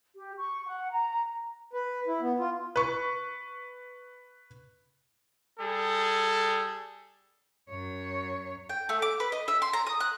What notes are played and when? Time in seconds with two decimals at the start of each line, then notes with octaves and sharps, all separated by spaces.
0.16 G4
0.38 C#6
0.66 F#5
0.90 A#5
1.73 B4
2.07 E4
2.21 B3
2.39 F4
2.76 B4 C#6
5.59 G3 G#4 A4
7.70 F#2 C#5
8.69 G5
8.89 A3
9.02 D6
9.20 B4
9.32 D#5
9.48 E5
9.62 C6
9.73 A#5
9.87 D#6
10.00 F#6